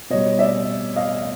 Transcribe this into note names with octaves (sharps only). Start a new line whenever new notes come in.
B2 G3 C#5 D#5
D5 E5
D#5 F5